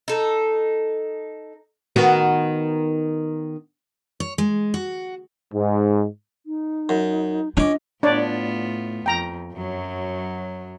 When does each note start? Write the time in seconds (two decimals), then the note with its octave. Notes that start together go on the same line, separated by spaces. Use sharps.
0.08 D#4 A4
1.96 D#3 B3 F#4
4.20 C#5
4.38 G#3
4.74 F#4
5.52 G#2
6.46 D#4
6.89 F#2
7.57 C#4 D4 F4 D#5 D6
8.03 A2 B3 D4 F4 C#5 D5
9.06 F2 G5 A#5
9.54 F#2 F#3